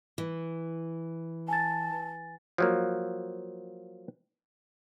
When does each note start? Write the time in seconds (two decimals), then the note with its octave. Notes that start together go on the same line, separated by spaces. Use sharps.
0.18 E3
1.48 G#5 A5 A6
2.58 F3 F#3 A#3